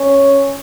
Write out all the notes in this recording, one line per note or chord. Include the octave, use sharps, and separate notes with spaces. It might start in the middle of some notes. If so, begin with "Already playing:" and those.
Already playing: C#4